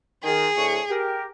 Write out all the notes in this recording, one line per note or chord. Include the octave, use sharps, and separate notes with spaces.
D#3 G#4
D2 A2 C#6
G4 A#4